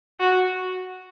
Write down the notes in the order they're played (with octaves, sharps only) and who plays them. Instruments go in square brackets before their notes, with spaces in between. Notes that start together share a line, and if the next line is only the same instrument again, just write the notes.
[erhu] F#4